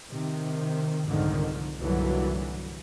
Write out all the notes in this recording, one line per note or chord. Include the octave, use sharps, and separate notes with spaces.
C3 D#3
C2 F2 G#2 D3 D#3
C2 G2 A#2 D3 E3 F#3